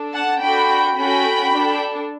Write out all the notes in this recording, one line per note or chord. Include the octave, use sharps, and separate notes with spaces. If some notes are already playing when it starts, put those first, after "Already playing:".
Already playing: D4 A4
F#5 A5
D4 F#4 A4 G5 B5
C#4 F#4 A4 G5 B5
D4 A4